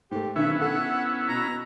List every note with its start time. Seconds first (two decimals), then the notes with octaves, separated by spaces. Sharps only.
0.11 G#2 A3 G4
0.36 B1 D3 D#3 B3 C#4 E4 E5
0.61 A4 F#5
1.29 B2 A#5